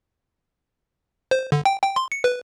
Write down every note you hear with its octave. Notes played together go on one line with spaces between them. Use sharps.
C5
D3
G5
G5
C6
C#7
B4